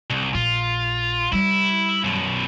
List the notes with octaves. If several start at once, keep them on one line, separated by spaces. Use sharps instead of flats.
C2
A#1 F4
G3 E4
F#2 B2